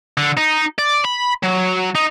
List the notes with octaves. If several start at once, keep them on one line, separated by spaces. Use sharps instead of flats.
D3
D#4
D5
B5
F#3
D#4